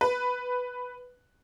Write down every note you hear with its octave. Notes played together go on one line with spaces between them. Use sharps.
B4